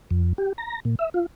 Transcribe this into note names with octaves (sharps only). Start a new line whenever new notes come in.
F2
G4
A#5
A#2
E5
F4